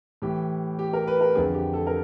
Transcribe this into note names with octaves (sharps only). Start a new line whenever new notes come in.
A2 E3 G4
G4
A#4
B4
A#4
F2 D3 G#4
G4
A4
A#4